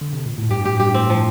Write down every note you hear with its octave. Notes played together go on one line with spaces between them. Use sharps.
D3
C3
A#2
A2
G2 G4
A2 G4
G2 G4
A2 C4
A2 F3